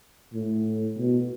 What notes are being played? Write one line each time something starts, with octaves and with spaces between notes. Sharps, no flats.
A2
B2